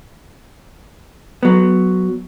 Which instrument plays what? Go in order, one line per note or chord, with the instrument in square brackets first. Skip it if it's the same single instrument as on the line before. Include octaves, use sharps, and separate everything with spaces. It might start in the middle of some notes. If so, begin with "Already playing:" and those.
[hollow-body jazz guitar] F#3 B3